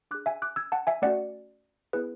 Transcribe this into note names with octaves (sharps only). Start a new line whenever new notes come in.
D4 G#4 D6 F#6
E5 G#5
D6 F#6
E6 G#6
F#5 A5
E5 G#5
A3 C#4 F#4 D5 F#5
B3 E4 G#4 B4